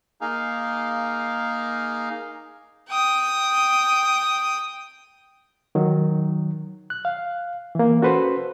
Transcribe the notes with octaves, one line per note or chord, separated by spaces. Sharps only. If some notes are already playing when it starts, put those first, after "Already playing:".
A#3 D#4 G#4 F5
G5 D#6
D#3 F#3
F#6
F5
E3 A#3
C#4 F#4 A4 B4 C5